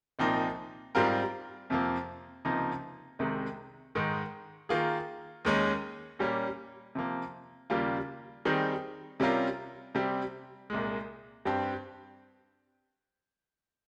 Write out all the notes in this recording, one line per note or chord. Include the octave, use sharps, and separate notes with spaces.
C2 A#2 F3 C4 D#4
G#2 G3 C4 F4 A#4
F2 C3 F3 A#3
C#2 C3 F3 A#3 D#4
C2 C3 D#3 G#3
G#2 D#3 G#3
D#3 A#3 F4 G#4
D#2 D#3 G#3 C#4
A#2 G3 A#3 C#4
C3 F3 A#3
D#2 C#3 G3 A#3 F4
D#3 G3 C4 D#4 G#4
C3 G3 C#4 F4 A#4
C3 G3 C4
C2 A#2 G#3
G2 G3 C4 G4